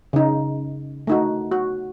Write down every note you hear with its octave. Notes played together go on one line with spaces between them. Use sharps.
C#3 D#4
A3 D#4 F#4
F#4